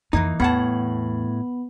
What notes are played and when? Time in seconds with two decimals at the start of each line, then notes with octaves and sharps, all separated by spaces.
0.13 F2 E3 A#3 D#4
0.40 E2 A2 B3 F#5 A5 B5